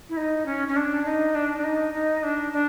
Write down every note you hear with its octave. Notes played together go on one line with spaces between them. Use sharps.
E4
D#4
C#4
C#4
D4
D#4
D4
D4
D#4
D#4
D4
D4